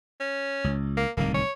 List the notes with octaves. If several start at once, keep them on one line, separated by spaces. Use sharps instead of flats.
C#4
C#2
A#3
D1 C2 D#3 A#3
C#5